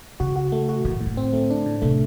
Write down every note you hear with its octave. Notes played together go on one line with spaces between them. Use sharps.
C#3 F#4
F#4
A3
F#4
A2 D#3
A2
D3
C4
A3
D4
A2
C3 A3